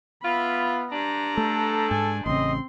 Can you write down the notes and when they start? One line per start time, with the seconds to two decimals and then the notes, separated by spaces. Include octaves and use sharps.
0.24 B3 F4 E5 B5
0.91 G2 G3 D4 A#5
1.37 A3 A4
1.91 G#2 G#5
2.26 A1 C#3 C4 D#5 C6